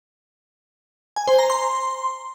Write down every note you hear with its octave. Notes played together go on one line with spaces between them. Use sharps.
G#5
C5
A#5
C6